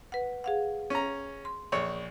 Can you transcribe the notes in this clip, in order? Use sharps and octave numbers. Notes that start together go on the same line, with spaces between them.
B4 F#5
G#4 F5 F#5
C#4 A#5
C6
A#1 C#5